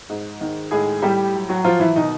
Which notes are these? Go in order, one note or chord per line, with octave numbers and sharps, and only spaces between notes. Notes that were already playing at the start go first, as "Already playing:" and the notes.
G#2
D#3
A2 G#3 G#4
A2 G3 G4
F#3
F#3 F#4
F3 F#3 F4
E3 E4
B2 D#3 D#4